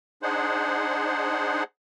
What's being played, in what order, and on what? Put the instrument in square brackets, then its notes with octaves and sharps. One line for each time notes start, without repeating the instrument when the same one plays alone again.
[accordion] D4 D#4 G#4 C5 F#5